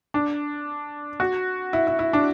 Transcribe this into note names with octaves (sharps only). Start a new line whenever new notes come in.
D4
F#4
E4
E4
E4
D4